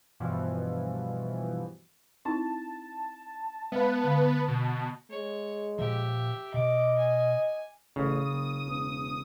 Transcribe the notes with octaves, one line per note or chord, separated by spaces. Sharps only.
G2 B2 E3 F3
C4 D#4 E4 A5
G#3 B3 B4 F5
D3 F5
B2
G#3 C#5
A#2 F3 G4 E5
B2 D#5 D6
G#5
A1 C#3 D#6
F#1
E1